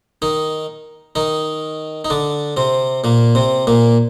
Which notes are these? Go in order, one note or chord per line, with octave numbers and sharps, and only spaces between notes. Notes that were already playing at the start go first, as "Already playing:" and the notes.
D#3 D#4
D#3 D#4
D#4
D3 D4
C3 C4
A#2 A#3
C3 C4
A#2 A#3